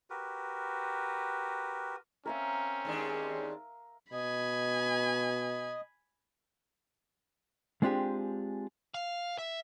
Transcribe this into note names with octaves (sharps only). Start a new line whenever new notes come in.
F#4 G4 A#4 B4
C4 C#4 A#4 E5 F5
D#2 G#3 D4
B2 D#5 G#5 B5
G#3 C4 D4 F4 G4 G#4
F5
E5